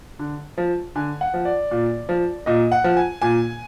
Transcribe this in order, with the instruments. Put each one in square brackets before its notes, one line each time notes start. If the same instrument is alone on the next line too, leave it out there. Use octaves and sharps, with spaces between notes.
[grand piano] D3
F3
D3 G#5
F#5
F3
D5
A#2
F3
A#2 D#5
F#5
F3
G#5
A#2 G#5